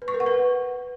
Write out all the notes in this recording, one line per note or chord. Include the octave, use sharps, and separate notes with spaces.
B4
C#6
A#4
F#5
B4